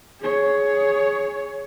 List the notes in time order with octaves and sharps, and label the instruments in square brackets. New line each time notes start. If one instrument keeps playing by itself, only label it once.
[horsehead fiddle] G#4 C#5